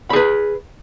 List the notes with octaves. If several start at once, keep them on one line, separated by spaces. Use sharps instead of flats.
G#4 B4 B5